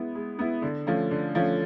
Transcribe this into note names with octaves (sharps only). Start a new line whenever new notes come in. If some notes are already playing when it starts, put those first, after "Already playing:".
Already playing: G#3 B3 E4
G#3
B3 E4
D3
F3 A3 C#4
D3
F3 A3 C#4